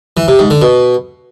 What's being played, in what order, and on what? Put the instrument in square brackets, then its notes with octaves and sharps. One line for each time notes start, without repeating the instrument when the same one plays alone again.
[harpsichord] E3
C3
G#2
D3
B2